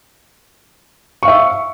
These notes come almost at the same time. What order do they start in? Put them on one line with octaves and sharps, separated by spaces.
C#6 F5 E5